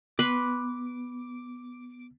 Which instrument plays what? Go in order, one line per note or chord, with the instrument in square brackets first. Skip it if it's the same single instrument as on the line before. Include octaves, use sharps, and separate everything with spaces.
[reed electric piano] B3 [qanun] B4 B5 C6 [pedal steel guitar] D6